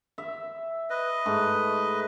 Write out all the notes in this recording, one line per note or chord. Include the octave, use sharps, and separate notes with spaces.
E5
B4 D#5
G#2 A3